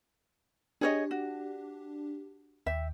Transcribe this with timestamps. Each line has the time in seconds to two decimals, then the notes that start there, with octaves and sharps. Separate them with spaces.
0.81 D4 G4 G#4 C#5 D#5
1.11 F#4
2.66 D#2 E5 G5